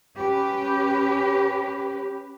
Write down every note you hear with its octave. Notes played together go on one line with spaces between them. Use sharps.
C#4 G4 B4